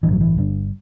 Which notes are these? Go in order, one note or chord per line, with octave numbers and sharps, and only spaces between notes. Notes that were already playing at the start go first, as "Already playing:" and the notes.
A1 G2 D3 E3
F#3
E3
G1 G2 D3